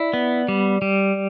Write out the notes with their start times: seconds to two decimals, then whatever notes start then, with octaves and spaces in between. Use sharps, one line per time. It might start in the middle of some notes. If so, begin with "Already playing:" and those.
Already playing: E4 D5
0.13 B3
0.48 G3
0.82 G3